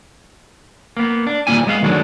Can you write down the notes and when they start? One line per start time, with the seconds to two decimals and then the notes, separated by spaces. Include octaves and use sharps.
0.97 A#3 B3
1.27 D4
1.47 D#2 A#2 E3 G3 G#5
1.67 G#3 B3 E5 F5
1.82 D#3 F#3 G#3 A3 D4